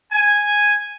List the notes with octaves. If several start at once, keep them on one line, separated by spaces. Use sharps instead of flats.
G#5